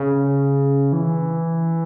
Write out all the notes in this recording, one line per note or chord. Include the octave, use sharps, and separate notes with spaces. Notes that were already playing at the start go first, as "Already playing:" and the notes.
Already playing: C#3
E3